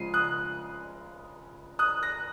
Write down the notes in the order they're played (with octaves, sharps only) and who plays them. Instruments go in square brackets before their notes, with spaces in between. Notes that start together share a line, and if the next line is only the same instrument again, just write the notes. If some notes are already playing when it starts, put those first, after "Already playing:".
Already playing: [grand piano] C#3 F3 G#3 C7 D#7
D#6 F#6
D#6 F#6
F#6 A#6